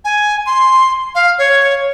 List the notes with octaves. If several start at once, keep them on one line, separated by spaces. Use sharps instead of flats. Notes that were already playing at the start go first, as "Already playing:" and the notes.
G#5
C6
F5
C#5